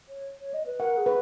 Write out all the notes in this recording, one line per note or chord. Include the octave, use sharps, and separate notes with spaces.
C#5
C#5
D#5
B4
A#4 F#5
G#4
B4